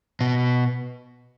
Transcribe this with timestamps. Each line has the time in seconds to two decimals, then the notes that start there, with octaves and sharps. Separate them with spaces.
0.21 B2